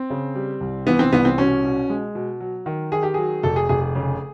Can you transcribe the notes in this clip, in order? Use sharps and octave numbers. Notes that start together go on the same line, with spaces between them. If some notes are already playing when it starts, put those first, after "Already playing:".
Already playing: C4
C#3
G3
C2
E3 B3
C4
C2 B3
C4
B2 C#4
B2
G#3
B2
F#3
D#3
D#3 G#4
G4
F#3 G#4
F1 A4
G#4
F1 G#4
G#4
C#3